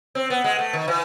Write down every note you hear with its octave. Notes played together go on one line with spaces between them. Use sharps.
C4
B3
G#3
A3
D#3
E3